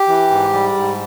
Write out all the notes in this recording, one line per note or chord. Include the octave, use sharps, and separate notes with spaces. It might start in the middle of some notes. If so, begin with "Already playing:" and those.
Already playing: G4
E3
G#2
G3
G#2